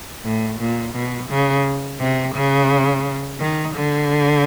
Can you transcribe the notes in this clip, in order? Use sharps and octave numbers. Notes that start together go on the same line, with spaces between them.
A2
A#2
B2
C#3
C3
C#3
D#3
D3